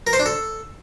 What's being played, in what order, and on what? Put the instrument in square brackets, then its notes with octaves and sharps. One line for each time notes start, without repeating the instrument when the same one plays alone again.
[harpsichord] A#4
C5
D4
A4